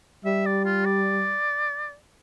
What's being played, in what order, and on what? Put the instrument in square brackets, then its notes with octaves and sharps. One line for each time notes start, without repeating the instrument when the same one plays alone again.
[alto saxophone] G3 [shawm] E5
[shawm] D5
F4
D5